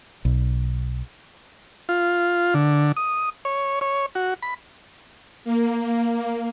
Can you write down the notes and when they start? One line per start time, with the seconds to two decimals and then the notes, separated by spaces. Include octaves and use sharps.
0.25 B1
1.89 F4
2.54 D3
2.97 D#6
3.45 C#5
3.81 C#5
4.15 F#4
4.43 B5
5.44 A#3